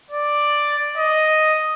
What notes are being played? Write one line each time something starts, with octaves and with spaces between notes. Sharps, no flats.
D5
D#5